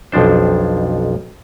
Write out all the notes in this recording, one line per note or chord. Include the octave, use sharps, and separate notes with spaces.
B1 F2 F3 D4 C5